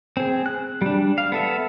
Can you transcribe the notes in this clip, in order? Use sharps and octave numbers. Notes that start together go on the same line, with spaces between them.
C4 G#4
F#6
G3 D4
F5
B3 A4 E5